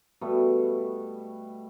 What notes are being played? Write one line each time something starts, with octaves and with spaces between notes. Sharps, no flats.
B2 G3 A3